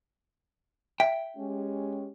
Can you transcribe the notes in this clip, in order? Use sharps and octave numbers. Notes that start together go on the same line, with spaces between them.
E5 G5
G#3 C#4 G4